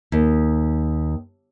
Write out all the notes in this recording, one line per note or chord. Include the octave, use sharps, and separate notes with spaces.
D#2